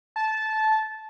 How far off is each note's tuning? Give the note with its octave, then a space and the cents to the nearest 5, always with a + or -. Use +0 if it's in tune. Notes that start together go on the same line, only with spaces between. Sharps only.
A5 -15